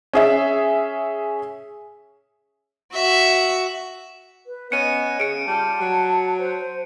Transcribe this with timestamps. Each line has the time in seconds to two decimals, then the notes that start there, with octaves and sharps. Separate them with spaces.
0.13 C#4 G#4 E5
2.93 F#4 E5
4.47 B4
4.72 B3 C#4 D#5 C#7 D#7
5.20 C#3 C#7 D7
5.47 G3 F4 G4 A5
5.80 F#3
6.39 C5